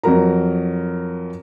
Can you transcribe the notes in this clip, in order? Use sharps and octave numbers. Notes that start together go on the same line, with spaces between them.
F2 F#3 F#4 A#4 A#5